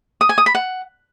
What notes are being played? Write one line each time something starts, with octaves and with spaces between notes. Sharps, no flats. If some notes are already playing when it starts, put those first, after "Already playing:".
D#6
G#5
D#6
B5
F#5